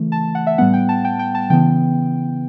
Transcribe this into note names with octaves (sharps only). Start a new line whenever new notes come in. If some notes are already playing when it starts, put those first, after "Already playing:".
Already playing: C#3 E3 A3
A5
F#5
E5
A2 G3 B3 F#5
G5
A5
G5
G5
A5
C#3 E3 B3 G5